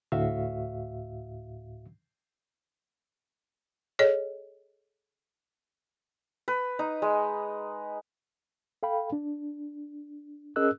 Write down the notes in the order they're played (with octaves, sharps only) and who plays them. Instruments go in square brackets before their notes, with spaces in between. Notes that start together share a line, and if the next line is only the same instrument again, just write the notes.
[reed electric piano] D2 A2 F#4 E5 F5
[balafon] G#4 A4 C#5 D#5
[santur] B4
D#4
G#3
[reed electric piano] A4 F5 G5 B5
D4
C#4 G#4 A#4 D#5 E6 F#6